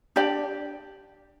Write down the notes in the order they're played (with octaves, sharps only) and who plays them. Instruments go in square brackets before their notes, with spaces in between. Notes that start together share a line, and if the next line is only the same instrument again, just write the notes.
[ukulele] D4 G4 D5 G5